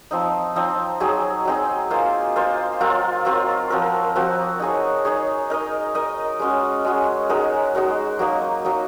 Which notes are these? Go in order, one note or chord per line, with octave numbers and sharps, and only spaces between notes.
F3 C4 D#4
F3 C4 D#4
F#3 C4 D#4 G#4
F#3 C4 D#4 G#4
A#3 F4 C5 F5
A#3 F4 C5 F5
F#3 C4 F4 A#4
F#3 C4 F4 A#4
F3 C4 F#4 A#4
F3 C4 F#4 A#4
D#4 G#4 C#5
D#4 G#4 C#5
D#4 A#4 D#5
D#4 A#4 D#5
G#3 C#4 F#4
G#3 C#4 F#4
G#3 D#4 F#4 A#4
G#3 D#4 F#4 A#4
F#3 A#3 D#4
F#3 A#3 D#4